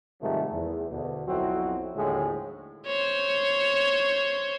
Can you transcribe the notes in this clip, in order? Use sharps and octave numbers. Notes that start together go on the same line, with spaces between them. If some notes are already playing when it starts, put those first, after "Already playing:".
G#2 C3 D#3 F3 G3 A3
E2
D2 B2
B1 F2 F#3 C4 E4 F#4
D#2 A2 D3 F3 G#3
C5 C#5